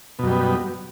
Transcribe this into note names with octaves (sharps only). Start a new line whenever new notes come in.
F#2 B2 G3 B3